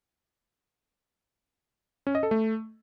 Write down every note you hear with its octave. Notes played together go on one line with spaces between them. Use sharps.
C#4
D#5
A4
A3